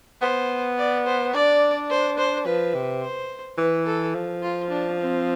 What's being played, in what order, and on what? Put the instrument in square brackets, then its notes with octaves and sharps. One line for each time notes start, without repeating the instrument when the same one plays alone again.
[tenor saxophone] B3 [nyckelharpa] C5
[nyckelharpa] D5
C5
[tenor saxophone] D4 [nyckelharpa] D5
[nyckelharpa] C5
C5
[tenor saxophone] F3 [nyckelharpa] B4
[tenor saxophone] C3
[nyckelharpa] C5
[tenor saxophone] E3 [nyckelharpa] B4
[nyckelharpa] A4
[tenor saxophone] F3
[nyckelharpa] F4
D4
C4